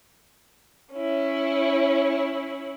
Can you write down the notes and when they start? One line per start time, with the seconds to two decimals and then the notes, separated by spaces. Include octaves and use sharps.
0.94 C#4 E4